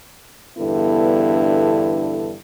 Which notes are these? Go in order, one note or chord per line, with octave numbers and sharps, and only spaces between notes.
E2 G2 D3 B3 E4 A4